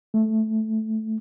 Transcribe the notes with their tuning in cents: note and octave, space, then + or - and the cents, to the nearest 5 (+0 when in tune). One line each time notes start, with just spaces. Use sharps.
A3 -5